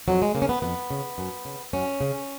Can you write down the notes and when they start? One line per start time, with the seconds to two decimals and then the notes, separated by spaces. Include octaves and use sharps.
0.08 F2 F#3
0.22 G#3
0.35 C#3 A#3
0.42 C#4
0.49 B3
0.62 F2 B3
0.91 C#3
1.18 F#2
1.45 C#3
1.73 F#2 C#4
2.01 C#3